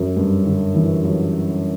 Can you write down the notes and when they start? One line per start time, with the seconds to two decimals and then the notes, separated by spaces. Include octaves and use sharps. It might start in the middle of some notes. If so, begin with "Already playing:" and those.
Already playing: F#2
0.16 G2
0.45 D3
0.74 E3
1.04 F#3